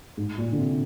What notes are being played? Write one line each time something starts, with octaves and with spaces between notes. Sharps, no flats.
G#2
A#2
D3
C3